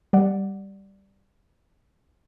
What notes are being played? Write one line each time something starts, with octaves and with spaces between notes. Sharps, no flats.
G3 D5 F#5